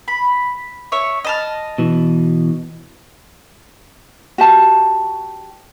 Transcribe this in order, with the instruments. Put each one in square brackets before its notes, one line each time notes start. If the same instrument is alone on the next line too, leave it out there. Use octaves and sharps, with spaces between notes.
[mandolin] B5
C#5 E5 C#6
D#5 A5 F6
[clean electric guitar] B2 E3
[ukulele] F#4 G4 A5